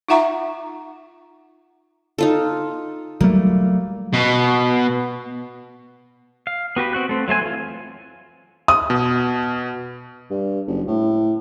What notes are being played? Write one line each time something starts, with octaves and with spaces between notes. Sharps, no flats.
D#4 F4 E5 F#5 A#5 C#6
D#4 F4 A4
F#3 G3 A3 A#3
B2
F5
B3 F#4 G4 B4
C4 F#4 F#6
A3 C4
F#3 A3 C5 G#5
E3 F4
D#6
B2
G2
F#1
A2